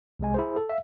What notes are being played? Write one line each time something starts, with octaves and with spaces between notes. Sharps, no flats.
C2 C3 G#3 G#5
E4 G#4 C5
A4
E5 F5